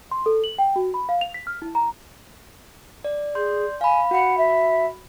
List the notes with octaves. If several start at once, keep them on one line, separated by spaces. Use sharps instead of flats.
C6
A4
F#7
G5
F#4
B5
F5
F7
B6
F6
E4
A#5
D5
G#4 D5 C6 G6
F5 G#5 B5
F#4 F#5 B5
E5